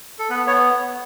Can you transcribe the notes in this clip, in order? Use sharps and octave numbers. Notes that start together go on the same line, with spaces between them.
A4
B3 B4
B3 C#5